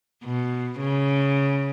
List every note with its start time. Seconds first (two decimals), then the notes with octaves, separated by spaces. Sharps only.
0.24 B2
0.80 C#3